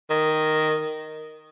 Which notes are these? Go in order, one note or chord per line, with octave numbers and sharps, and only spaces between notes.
D#3